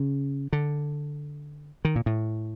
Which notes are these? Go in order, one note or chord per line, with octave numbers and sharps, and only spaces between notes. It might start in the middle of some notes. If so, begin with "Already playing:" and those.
Already playing: C#3
D3
D#3
A#2
A2